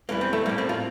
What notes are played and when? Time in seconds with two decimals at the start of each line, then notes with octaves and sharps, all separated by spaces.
0.09 E2 E3 G3 A#3
0.21 C4
0.33 A3
0.46 G3 A#3
0.49 A2
0.58 C4
0.69 F4